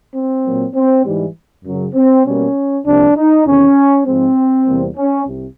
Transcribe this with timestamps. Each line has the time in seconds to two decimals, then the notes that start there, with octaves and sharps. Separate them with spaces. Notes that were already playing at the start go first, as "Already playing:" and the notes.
0.15 C4
0.45 A#2 F#3 A#3
0.75 C4
1.04 G#2 E3 G3
1.65 F#2 C#3 F#3
1.95 C4
2.25 B2 G3 A#3 C#4
2.86 C2 C3 F3 A#3 D4
3.16 D#4
3.45 E2 C3 D#3 C#4
4.06 G#2 F3 G#3 C4
4.67 E2 C3 E3 G3 A#3
4.96 C#4
5.26 C2 C3